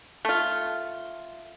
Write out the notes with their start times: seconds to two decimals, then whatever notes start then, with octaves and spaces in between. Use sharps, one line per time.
0.25 A3 F4